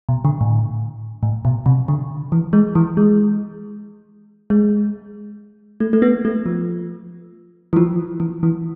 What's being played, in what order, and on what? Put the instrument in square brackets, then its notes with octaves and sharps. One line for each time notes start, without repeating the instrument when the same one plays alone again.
[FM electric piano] B2
D3
A2
A2
B2
C3
D3
E3
G#3
E3
G#3
G#3
A3
A3
B3
A3
F3
E3
F3
E3
E3